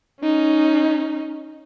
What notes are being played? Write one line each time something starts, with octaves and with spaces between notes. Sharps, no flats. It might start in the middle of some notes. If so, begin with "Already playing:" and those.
C#4 D#4